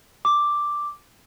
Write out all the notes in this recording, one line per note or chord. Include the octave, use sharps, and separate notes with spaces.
D6